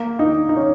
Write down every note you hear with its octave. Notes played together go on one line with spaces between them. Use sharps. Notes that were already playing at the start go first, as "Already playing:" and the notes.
Already playing: A#3
D#4
D#4
C#4